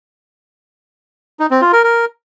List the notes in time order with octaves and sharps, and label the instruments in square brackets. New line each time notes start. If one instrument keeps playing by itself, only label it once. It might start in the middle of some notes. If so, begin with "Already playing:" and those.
[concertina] D#4
C4
F4
A#4
A#4